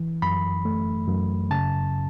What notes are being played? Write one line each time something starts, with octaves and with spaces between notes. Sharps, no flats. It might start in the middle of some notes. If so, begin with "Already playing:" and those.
Already playing: E3
F#2 B5
A3
F#2
C#3 A5